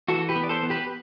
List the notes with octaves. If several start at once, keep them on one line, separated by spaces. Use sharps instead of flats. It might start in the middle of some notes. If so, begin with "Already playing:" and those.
E3 F#4 A4
G4 B4
B3
D5
A4 C5
B3
G4 B4